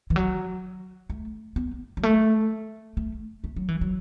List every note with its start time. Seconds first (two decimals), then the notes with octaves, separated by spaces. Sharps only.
0.10 E3
0.16 F#3
1.10 A3
1.56 B3
1.97 F#3
2.03 A3
2.97 A3
3.44 A3
3.56 F#3
3.68 E3
3.81 F#3